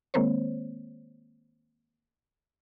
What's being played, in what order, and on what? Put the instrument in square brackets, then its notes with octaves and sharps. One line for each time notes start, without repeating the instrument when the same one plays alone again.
[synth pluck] D#3 G#3 A#3 C4 C5 C#5